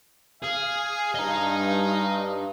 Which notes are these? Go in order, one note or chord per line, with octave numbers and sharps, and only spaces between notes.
G#4 F5 G#5
G2 D#5 A#5